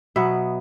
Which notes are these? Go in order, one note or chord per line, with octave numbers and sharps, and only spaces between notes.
B2 F#3 B3 E5